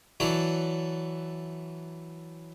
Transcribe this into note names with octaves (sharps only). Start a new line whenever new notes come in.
E3 F#3 A4 C#5 D5